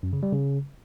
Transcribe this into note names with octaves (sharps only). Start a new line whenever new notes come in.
F#2
C#3
G3
C#3